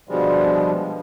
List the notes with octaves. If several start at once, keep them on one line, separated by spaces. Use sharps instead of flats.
B2 D3 F3 G3 G#3